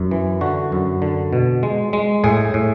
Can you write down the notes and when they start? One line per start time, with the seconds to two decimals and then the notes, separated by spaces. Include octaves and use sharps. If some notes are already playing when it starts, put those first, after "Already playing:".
Already playing: F#2
0.11 E3
0.41 D3 F#4
0.72 F#2
1.02 D3
1.33 B2
1.63 G#3
1.93 G#3
2.24 A2 G#4
2.54 A2